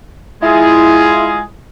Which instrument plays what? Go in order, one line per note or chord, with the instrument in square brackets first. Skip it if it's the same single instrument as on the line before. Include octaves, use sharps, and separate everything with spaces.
[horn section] G#3 F4 G#4 [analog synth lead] E4